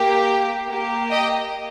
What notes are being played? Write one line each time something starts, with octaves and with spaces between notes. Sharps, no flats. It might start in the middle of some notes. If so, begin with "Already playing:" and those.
Already playing: A#3 G4
A#3 G4
D#5 G5